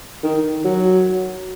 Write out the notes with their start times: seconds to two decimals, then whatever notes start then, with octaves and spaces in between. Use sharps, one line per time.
0.24 D#3
0.65 F#3